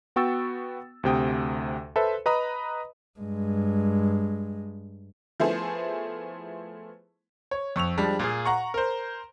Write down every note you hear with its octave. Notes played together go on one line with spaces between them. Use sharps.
B3 F#4 G5 C#6 E6 A6
D2 C3 G5 D#6
A4 B4 C5 E5
B4 D#5 A#5 B5 D#6
G2 G#3
F3 A3 B3 E4 G#4 C5
C#5
F2 C#6 E6 F7
F3 G3 G#3 D4
A#2 F4 G#4
F#5 A#5 C#6
A#4 C5